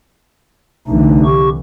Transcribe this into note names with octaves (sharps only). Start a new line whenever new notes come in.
C2 D3 E3 A3 D4 D#4
G4 C#6